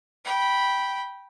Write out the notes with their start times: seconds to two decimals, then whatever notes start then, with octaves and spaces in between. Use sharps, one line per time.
0.24 G5 B5